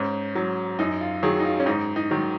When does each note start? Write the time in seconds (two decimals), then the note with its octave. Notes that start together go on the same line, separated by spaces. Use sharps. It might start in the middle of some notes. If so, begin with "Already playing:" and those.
Already playing: G#2 C#4
0.35 F#3
0.79 F#2 D#4
1.01 F4
1.23 D#3 F#3 G#4
1.40 D#4
1.45 F4
1.60 C#4
1.66 G#2 D#4
1.96 D#4
2.11 D#3 F#3